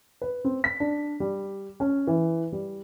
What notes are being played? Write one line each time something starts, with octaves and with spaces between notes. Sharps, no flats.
B4
C4
B6
D4
G3
C#4
E3
G3